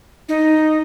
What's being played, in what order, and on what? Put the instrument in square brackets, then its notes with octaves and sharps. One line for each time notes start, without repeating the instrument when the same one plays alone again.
[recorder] D#4